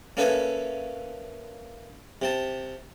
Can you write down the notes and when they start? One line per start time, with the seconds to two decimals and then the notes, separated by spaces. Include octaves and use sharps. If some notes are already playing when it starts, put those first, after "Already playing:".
0.17 A#3 C#4 A4 B4 E5 G#5
2.22 C3 G5 A5